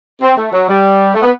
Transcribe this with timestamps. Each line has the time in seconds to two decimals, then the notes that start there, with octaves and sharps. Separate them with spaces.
0.22 C4
0.37 A3
0.52 F#3
0.68 G3
1.15 A3
1.23 B3